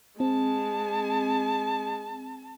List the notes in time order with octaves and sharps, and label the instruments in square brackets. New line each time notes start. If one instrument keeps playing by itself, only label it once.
[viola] G#3 [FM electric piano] C4 [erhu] A5